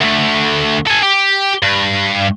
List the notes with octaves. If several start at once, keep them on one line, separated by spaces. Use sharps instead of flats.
D2 A3
A4 G#5
G4
G2